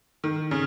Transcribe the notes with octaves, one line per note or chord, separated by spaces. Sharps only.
D#3
C#3